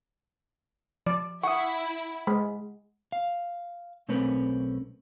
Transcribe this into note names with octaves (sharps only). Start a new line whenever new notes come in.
F3 D5
E4 F#5 C#6 D#6
G#3 B5
F5
B1 A3 C4 C#4 A#4 B4